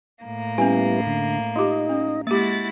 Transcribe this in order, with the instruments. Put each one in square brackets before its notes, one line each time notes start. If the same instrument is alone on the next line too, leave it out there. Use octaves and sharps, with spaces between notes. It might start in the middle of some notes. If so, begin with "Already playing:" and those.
[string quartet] A2 A#3
[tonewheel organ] G3 B3 E4 [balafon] C#4 G#5
[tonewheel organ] D3
[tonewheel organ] D#4 D#5 [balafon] F4 G4
[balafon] C#4
[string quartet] G#3 E4 F#4 [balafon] A#3 G4 [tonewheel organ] A6